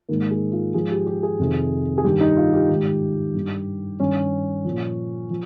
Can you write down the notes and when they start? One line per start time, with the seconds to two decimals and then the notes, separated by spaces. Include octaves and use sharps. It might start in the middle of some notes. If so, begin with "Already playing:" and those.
0.09 G#2 D#3 A#3
0.31 G#4
0.52 F4
0.74 G#2 F3 G#4
0.91 G4
1.07 G4
1.23 G#4
1.39 F2 C3 D#3
1.98 G#4
2.04 G2 D#3 G4
2.21 D#4
2.37 F4
2.53 G4
2.69 G#2 D#3
3.34 G2 D#3
4.00 G2 D#3 C#4
4.64 A#2 F3
5.30 F3